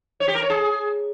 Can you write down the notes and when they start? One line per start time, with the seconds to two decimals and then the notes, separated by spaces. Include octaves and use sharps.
0.20 C#5
0.28 G4
0.35 A#4
0.42 C#5
0.50 G#4